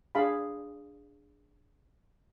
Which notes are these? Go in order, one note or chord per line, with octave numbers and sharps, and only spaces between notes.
D4 G#4 F5 A5 B5